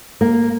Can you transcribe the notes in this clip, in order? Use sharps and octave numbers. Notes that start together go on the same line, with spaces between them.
A#3